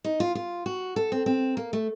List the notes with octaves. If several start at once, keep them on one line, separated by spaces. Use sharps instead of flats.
D#4
F4
F4
F#4
A4
C4
C4
A#3
A3